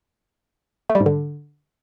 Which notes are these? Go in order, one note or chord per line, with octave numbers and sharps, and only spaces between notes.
A3
G3
G#2
D3